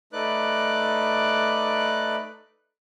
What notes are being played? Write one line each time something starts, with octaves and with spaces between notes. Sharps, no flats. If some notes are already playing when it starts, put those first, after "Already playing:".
A3 D#4 B4 D5 D6 F#6